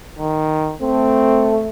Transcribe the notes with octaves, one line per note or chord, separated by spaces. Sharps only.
D#3
A3 C4